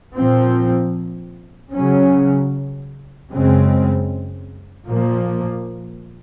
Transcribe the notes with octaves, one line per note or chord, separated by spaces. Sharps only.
A#2 F3 C4
C#3 F#3 C#4
F#2 C#3 G#3 C4
A#2 F3 A#3